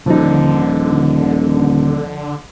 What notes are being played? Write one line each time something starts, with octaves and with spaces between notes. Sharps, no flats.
D#1 D3 F3 D#4